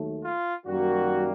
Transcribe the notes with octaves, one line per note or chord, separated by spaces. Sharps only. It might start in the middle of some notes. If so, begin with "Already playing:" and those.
Already playing: D#2 D#3 F#3 A3
F4
F#2 D#3 G3 A#3 F#4